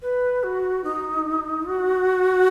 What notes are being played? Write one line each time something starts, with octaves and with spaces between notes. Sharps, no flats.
B4
F#4
D#4
F#4